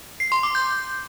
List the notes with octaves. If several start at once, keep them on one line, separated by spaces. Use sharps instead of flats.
C7
C6
D6
G6